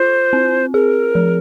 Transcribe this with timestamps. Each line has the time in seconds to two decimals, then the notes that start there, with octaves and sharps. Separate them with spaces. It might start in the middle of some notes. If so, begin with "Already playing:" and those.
Already playing: F4 C5
0.33 C4
0.74 G#4 A#4
1.15 F3